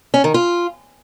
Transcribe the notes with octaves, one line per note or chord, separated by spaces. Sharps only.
C#4
D#3
F4